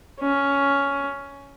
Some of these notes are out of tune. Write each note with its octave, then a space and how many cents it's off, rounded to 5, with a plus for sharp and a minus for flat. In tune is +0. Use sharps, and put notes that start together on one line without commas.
C#4 +10